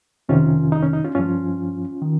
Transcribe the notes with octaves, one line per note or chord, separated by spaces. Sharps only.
F2 C3 D#3 C#4 F4
D#4
C#4
D#4
C#4 F4
G2 F3 C#4 F4
D#3